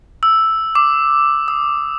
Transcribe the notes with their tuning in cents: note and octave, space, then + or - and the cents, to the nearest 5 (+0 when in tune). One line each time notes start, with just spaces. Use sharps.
E6 +0
D6 +5
D#6 +15